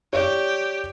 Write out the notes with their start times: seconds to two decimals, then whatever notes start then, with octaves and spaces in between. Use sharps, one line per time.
0.13 G4 C#5 D5